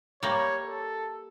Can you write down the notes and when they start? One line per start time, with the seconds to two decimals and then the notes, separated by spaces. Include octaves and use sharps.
0.23 G3 A#3 C#5
0.63 A4